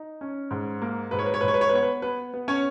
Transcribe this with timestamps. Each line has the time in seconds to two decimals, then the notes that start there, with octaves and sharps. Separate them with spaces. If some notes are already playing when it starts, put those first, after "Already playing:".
Already playing: D#4
0.21 C#4
0.51 G#2
0.82 A#3
1.11 G#2 B4
1.19 C#5
1.26 B4
1.34 C#5
1.41 G#2 B4
1.48 C#5
1.54 B4
1.61 C#5
1.69 B4
1.73 B3 C#5
1.83 B4
2.02 B3 B4
2.34 B3
2.48 C#4 C#5